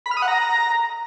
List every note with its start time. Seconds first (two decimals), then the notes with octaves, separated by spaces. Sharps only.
0.06 B5
0.11 F6
0.17 D#6
0.22 F#5
0.28 A#5